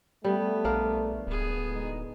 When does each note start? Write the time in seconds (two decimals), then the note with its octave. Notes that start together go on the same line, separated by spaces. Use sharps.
0.24 G3 A3 B3
0.64 A#1 D4 A#4 F5
1.27 D1 B3 G#4
1.71 G#3 D#4